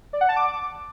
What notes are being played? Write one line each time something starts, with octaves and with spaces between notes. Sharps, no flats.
D5
F#5
A5
D6